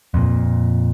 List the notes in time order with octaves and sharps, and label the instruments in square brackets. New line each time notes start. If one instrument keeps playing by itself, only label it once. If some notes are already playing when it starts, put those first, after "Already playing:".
[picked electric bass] F2 A#2